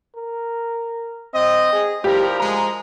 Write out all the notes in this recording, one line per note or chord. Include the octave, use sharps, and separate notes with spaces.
A#4
C4 D#5
G#4
F3 G3 E4 G4 A#4
G#3 A#5